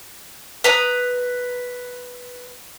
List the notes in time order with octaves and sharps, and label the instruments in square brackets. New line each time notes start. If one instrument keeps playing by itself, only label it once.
[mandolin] B4 A#5 D#6